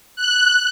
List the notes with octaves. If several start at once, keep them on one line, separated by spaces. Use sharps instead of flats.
F#6